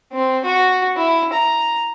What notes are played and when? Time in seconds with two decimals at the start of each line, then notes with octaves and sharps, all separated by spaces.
0.13 C4
0.44 F#4
0.96 E4
1.33 A#5